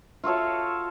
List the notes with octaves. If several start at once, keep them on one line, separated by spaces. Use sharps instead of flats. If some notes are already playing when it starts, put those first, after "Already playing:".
F4 F#4 A4 C#5